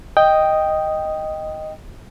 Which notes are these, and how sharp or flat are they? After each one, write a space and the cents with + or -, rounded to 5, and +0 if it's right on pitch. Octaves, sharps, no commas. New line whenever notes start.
D#5 +0 G5 +0 D#6 +0